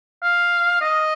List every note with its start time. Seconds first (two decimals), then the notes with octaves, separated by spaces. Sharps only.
0.22 F5
0.81 D#5